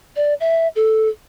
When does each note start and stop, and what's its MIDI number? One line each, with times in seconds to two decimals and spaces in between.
0.16 0.34 74
0.40 0.68 76
0.76 1.09 69